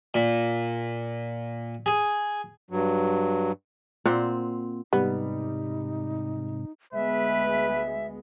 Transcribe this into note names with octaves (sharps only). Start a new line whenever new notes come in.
A#2
G#4
G2 F#3
A#2 C4 F#5
G#2 C3 G3 B3 D#4
D2 G#3 B3 B4 E5